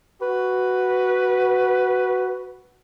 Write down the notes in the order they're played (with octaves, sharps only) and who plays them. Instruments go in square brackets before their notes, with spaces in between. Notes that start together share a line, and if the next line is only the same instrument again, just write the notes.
[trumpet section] F#4 [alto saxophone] B4